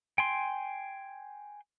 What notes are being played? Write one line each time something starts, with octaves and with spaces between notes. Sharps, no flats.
G5 G#5 C6